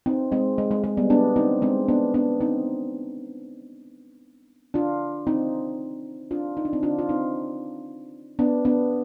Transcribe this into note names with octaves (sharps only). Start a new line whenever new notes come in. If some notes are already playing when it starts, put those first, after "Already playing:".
C4 D#4
G#3 C4
G#3
G#3
G#3
G3 B3
B3 D4
C4 D#4
G#3 C4
B3 D4
B3 D4
C4 D#4
D4 F4
C4 D#4
D4 F4
D#4
D4
C4 D#4
D4 F4
F4
C4 D#4
B3 D4
B3 D4